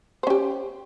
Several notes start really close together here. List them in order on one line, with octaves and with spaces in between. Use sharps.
C5 C#4 G4